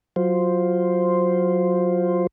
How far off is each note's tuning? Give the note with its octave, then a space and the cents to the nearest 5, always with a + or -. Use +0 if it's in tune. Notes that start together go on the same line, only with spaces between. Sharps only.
F#3 -10 F4 +0 C5 +0